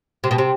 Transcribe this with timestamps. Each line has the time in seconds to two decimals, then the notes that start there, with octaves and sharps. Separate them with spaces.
0.24 C3
0.31 B2
0.38 C3